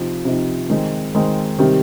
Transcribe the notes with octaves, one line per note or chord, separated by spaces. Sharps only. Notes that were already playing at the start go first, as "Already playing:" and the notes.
Already playing: C3 F3 C4 D#4
C3 F3 C4 D#4
D#3 G#3 C4 D#4
D#3 G#3 C4 D#4
C3 D#3 G3